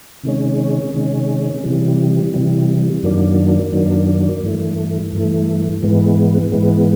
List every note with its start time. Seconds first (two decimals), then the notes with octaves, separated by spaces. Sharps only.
0.24 C3 D#3 G#3 C#4
0.94 C3 D#3 G#3 C#4
1.64 C3 E3 G3
2.34 C3 E3 G3
3.03 F#2 D#3 F#3 A#3 D4
3.73 F#2 D#3 F#3 A#3 D4
4.43 G2 E3 A3
5.12 G2 E3 A3
5.82 G#2 E3 G#3 B3
6.52 G#2 E3 G#3 B3